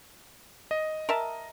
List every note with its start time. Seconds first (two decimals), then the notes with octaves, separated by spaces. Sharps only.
0.71 D#5
1.09 A#4 E5 A5